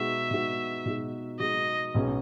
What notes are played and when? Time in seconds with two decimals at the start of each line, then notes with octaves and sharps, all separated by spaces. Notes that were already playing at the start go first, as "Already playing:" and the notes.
Already playing: B2 G#3 D#4 F#4 E5
0.31 B2 G#3 D#4 F#4
0.86 B2 G#3 D#4 F#4
1.39 B2 G#3 D#4 F#4 D#5
1.94 B1 B2 G#3 C#4 G#4